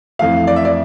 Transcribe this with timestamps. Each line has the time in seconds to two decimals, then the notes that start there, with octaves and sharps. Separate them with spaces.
0.19 F2 E3 A3 F5
0.47 D5
0.56 E5
0.65 D5